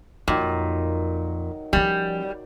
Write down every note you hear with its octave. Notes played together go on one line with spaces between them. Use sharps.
F2 A#2 D#3 F#3
F3 G3 C#4